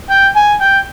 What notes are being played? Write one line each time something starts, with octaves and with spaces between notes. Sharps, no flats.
G5
G#5
G5